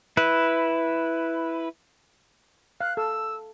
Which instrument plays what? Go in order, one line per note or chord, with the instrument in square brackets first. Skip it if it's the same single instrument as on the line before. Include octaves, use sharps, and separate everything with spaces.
[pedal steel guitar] E4 B4
[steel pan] F5 [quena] F#6
[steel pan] A4 [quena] E6